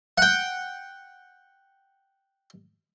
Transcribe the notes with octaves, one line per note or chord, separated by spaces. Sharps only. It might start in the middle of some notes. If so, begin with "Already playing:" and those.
F#5 G5